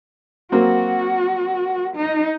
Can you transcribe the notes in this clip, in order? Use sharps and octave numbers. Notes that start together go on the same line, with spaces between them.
F#3 A#3 C4 F#4
D#4